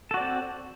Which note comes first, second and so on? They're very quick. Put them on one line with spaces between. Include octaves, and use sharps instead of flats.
A4 F#4 D5 C4